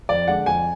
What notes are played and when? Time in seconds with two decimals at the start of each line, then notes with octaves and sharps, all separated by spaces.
0.09 F2 D5
0.28 D3 G#3 D4 F#5
0.46 F2 G#5